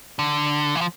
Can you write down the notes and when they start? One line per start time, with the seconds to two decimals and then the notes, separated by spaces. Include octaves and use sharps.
0.19 D3
0.75 E3
0.81 F3